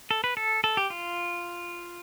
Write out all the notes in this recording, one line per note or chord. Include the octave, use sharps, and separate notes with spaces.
A4
B4
A4
A4
G4
F4